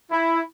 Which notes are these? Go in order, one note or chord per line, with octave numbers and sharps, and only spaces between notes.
E4